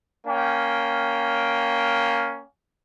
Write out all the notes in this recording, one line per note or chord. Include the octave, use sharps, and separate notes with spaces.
A#3 C#4 G5